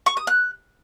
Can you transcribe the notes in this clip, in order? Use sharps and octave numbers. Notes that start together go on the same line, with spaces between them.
C#6
D#6
F#6